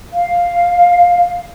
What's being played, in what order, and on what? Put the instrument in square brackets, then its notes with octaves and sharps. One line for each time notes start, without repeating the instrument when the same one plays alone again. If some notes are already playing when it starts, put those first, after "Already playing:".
[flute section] F5